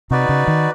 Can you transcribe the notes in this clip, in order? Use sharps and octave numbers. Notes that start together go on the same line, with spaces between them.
C3 D#4 F#4 B4 D5
C#3
D#3